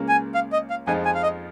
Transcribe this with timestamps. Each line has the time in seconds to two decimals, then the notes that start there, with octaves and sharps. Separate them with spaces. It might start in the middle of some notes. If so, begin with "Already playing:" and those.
Already playing: C#2 C#3 A#3 C#4
0.08 G#5
0.34 F5
0.53 D#5
0.70 F5
0.87 F2 F3 G#3 D#4 G#5
1.05 G#5
1.14 F5
1.23 D#5